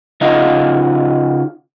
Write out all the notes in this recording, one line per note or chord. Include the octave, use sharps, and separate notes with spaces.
C#3 D#4 F4 F#4 D#5 F5